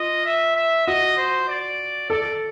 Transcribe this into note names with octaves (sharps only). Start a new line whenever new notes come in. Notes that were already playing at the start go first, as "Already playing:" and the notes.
Already playing: F4 D#5
E5
E5
F#4 D#5
C5
D5
A4 D5